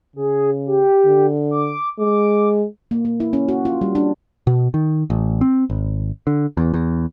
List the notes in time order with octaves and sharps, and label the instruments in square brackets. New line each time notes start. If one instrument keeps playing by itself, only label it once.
[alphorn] C#3 [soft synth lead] G#4
[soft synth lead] G4
[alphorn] D3
[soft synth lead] D6
[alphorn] G#3 [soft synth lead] D6
[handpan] A#3
A#3
E4
C#4
F#4
F4
G3
D4
[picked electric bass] B2
D#3
A1
C4
G#1
D3
E2
E2